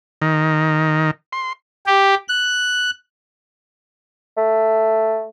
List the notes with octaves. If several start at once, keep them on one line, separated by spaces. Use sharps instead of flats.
D#3
C6
G4
F#6
A3